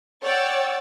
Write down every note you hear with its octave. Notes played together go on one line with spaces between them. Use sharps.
C#5 D5 F#5 G5 E6 A6